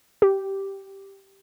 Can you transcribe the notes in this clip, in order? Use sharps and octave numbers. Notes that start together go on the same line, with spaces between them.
G4